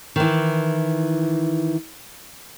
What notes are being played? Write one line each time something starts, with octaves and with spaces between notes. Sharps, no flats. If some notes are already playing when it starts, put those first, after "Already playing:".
D#3 E3